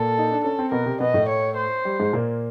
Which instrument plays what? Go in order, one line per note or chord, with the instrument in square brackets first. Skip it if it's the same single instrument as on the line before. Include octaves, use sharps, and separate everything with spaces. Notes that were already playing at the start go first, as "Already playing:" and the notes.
Already playing: [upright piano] A#2 A#3 [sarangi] A4
[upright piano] D#4
D4
[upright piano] C#4 [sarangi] A4
[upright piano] C4
[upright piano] B2 B3 [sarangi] A#4
[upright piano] C3 C4
[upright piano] B2 B3 [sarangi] D#5
[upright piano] A2 A3
[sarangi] C#5
C5
[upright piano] G3
G#2 G#3
A#2 A#3